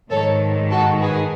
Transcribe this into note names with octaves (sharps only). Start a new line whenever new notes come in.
G#2 D#3 A4 C#5
F#4 A4
G#4 B4